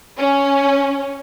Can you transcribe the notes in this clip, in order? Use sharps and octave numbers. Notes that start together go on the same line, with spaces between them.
C#4